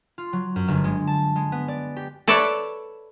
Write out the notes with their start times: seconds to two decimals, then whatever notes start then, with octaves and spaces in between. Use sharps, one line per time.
0.18 F4
0.33 F#3
0.56 F#2
0.68 G1
0.84 G#3
1.07 A5
1.36 G#3
1.52 B3
1.68 D5
1.96 G4
2.28 A4 B4 C#5 D5 E5